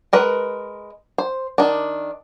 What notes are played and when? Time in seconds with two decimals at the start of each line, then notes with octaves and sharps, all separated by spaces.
0.13 G#3 A#4 B4
1.18 C5
1.58 D#3 D4